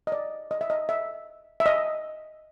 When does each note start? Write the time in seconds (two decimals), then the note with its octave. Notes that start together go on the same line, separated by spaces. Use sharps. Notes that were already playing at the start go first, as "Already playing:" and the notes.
0.07 D#5
0.12 D5
0.51 D#5
0.61 E5
0.70 D#5
0.89 E5
1.60 E5
1.66 D#5